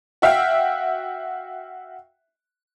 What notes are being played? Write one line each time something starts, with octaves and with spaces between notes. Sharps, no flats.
F#4 E5 F5 G5